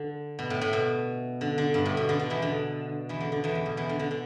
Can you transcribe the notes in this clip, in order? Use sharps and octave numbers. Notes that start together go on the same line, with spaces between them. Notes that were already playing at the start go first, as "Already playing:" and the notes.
Already playing: D3
B2
A2
A2
B2
D3
D3
G2
A2
B2
D3
D3
E2 E3
D3
E2 E3
D3
D3
E2 E3
D3
B2
E2 E3
D3
D3
D3